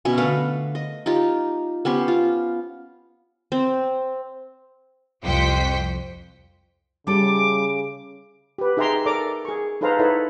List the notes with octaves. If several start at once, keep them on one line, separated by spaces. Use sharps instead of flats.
B2 C#4 E5 G#5
D3 A3 B4 F5
D#5
D#4 F4 G4
B3 C#4 G4 C5
F4
C4
C2 F2 C5 G5 B6 C#7
C#3 G3 E4 A4 D6
G4 B4
D#4 G#4 E5 G5 A#5 C6
A4 A#4 D5 A#5 D6
G#4 C#6
D#4 A4 B4 C5 F5 A#5
D#4 E4 A4 B4 C#5 E5